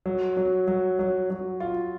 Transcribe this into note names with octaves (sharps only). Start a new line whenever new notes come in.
F#3
F#3
F#3
F#3
F#3
F4